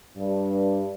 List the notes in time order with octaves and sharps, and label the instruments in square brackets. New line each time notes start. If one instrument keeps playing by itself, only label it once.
[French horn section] G2